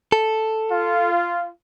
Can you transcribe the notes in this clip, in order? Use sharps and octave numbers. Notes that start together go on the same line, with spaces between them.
A4
F4